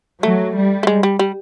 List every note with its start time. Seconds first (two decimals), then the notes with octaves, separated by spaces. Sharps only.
0.23 F#3 A3
0.55 G3
0.83 A3
0.87 G#3
1.03 G3
1.19 G3